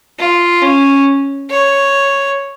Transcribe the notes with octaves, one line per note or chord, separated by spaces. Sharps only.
F4
C#4
C#5